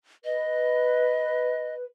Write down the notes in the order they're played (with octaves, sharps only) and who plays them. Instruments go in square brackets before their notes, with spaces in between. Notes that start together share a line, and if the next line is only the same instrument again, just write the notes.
[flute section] B4 [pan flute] D#5